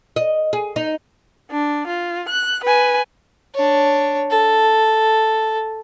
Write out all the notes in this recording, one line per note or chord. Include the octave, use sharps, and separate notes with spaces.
D#5
G#4
D#4
D4
F4
F#6
B4 G#5
D4 C#5
A4